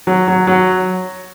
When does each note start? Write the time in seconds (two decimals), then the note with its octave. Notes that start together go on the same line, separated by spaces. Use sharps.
0.07 F#3
0.28 F#3
0.47 F#3